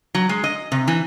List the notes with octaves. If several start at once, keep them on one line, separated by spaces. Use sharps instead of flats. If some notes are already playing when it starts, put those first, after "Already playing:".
F#3
G#3
D#5
C3
E3